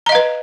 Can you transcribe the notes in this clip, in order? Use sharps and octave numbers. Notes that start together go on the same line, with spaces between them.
B4 D#5 F5 A#5